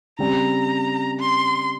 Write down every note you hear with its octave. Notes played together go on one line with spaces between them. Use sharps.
C#3 G3 C4 A#5
C6